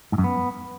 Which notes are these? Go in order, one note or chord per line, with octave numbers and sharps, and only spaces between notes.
G#2
F#2
B3